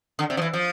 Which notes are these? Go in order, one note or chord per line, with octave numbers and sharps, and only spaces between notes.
D3
C3
F3
E3
F3